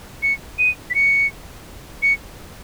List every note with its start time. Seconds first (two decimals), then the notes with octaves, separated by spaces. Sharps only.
0.23 C#7
0.59 D#7
0.90 B6
0.95 C#7
2.03 C#7